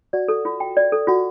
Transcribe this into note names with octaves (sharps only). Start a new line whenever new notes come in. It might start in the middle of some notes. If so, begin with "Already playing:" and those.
F#4 D5
A4
F4
G5
D5
A4
F4 F#4